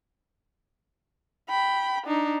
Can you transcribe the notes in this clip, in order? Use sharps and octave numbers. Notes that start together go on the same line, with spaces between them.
G5 B5
D4 D#4